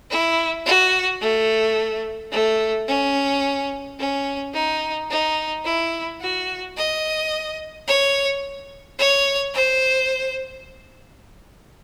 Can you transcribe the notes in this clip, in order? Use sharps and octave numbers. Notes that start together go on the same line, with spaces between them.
E4
F#4
A3
A3
C#4
C#4
D#4
D#4
E4
F#4
D#5
C#5
C#5
C5